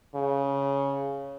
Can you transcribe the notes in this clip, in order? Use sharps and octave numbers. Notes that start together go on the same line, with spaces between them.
C#3